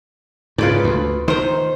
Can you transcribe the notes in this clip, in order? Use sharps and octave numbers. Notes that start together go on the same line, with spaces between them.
G#2 C#3 F4 B4 D5
D2
D#3 C5 A#5